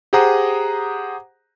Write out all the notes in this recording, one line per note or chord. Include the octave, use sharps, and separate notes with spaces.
G4 G#4 C5 F#5 A#5 D#6